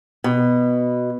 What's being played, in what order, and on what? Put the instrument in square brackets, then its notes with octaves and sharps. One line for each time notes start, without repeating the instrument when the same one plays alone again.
[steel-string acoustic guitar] B2